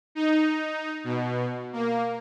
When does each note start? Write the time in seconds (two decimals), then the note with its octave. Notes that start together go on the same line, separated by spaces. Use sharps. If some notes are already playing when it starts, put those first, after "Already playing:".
0.15 D#4
1.04 B2
1.73 A#3